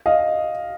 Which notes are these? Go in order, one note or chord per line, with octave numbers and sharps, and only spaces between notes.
D#5 F5